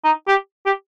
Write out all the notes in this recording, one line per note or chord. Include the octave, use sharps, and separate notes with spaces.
D#4
G4
G4